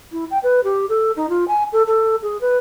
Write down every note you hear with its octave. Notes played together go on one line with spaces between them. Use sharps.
E4
G5
B4
G4
A4
D#4
F4
G#5
A4
A4
G#4
B4